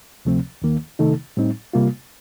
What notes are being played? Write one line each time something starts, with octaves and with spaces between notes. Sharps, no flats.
D2 C3 F3 A3 C4
D#2 D#3 A#3
C3 D#3 A3 D#4 A4
A2 G3 C4 D#4
C3 G3 A#3 F4